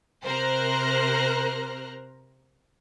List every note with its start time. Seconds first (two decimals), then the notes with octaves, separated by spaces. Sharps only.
0.24 C3 A#4 C5 A#5 F6 F#6